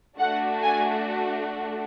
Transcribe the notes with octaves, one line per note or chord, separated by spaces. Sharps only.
A3 D4 F#4 F#5
G#5